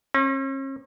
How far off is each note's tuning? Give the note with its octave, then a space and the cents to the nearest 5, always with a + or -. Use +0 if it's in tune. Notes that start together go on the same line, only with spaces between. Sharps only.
C#4 -45